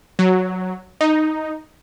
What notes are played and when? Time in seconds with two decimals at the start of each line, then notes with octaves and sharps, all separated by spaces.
0.19 F#3
1.01 D#4